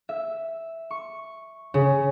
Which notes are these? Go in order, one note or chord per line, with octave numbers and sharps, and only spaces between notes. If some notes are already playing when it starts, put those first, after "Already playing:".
E5
C#6
C#3